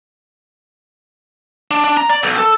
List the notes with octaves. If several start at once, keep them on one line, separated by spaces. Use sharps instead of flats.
D4
D4
A#5
D5
B1
A4